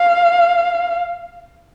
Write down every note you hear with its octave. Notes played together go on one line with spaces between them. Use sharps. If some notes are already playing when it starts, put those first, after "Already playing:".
Already playing: F5